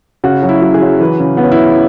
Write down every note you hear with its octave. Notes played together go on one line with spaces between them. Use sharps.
C#3 F#4
F#3
E4
F#3
G#4
F#3
E3 B4
C#3
C#3 B3
C#4
E4
C#3